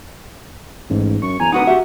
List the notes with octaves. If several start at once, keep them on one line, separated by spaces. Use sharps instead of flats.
A1 G#2
F#2 C#6
E2 G#5 A#5
D1 D#4 F#4 B4 F#5 D#6
F#4 G4 E5